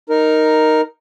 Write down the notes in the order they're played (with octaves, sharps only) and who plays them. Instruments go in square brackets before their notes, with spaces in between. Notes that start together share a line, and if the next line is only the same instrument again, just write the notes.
[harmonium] D#4 A#4